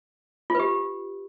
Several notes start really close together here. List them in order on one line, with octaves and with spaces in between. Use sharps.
F4 B4 G4